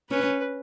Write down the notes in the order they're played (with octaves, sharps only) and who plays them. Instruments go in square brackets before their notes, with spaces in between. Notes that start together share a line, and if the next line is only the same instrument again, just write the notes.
[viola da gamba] C#4 [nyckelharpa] B4